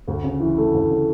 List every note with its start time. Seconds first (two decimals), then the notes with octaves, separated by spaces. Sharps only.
0.08 D2
0.24 C#3
0.40 E3
0.58 A3
0.74 D2
0.91 C#3